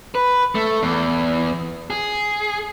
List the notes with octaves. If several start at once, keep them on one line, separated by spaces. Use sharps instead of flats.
B4
A3
E2
G#4